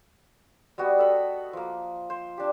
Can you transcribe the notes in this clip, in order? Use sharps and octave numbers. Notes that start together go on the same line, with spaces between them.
G3 B3 F#4 D#5
A4 B5
F3 A#3
C5
D4 G4